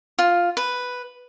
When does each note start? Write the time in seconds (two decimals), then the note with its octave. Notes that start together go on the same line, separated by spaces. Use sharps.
0.19 F4
0.57 B4